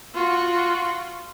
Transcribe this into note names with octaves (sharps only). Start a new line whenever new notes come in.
F4 F#4